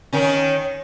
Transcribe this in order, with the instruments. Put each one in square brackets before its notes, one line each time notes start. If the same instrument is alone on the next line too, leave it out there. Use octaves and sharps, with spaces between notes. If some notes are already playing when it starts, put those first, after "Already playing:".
[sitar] D#3 C#4